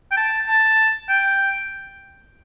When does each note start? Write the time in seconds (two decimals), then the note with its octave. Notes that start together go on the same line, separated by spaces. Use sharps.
0.11 G5
0.17 A5
0.48 A5
1.09 G5